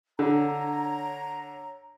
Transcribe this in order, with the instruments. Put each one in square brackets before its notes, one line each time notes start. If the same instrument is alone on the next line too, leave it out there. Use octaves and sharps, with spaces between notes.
[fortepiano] D3 [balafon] D4 [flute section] C#5 A#5